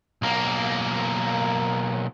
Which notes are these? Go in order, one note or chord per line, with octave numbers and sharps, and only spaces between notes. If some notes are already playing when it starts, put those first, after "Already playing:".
B1 A#3